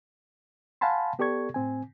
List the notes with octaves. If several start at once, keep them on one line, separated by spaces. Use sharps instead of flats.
F5 F#5 G#5 A5 B5 C6
B3 G4 A4 D5 C#6 G#6
A2 C4 G#5